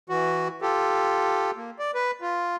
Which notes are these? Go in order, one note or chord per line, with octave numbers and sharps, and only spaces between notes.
E3 F#4
F4 G4 A4
A#3
D5
B4
F4